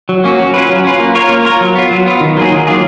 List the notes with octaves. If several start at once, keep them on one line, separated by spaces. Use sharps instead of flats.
F#3
A#3 C#4 F#4
F#3
C#4 F4 B4
F#3
C#4 F4 B4
A#3
F4 A#4 C#5
A#3
F4 A#4 C#5
F#3
B3 F4
F#3
B3 F4
D#3
F#3 A#3 F4 G#4
D#3
F#3 A#3 F4 G#4